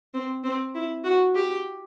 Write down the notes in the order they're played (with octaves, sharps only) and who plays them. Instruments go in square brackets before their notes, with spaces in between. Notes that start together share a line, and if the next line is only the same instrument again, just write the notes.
[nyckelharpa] C4
C4
E4
F#4
G4